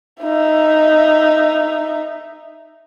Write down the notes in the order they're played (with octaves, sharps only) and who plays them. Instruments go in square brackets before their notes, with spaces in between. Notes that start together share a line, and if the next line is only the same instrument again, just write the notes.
[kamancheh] D#4 E5